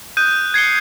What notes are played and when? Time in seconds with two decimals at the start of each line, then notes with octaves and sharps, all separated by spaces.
0.17 D#6 F#6 G6 D#7
0.54 G#6 C7 C#7 G7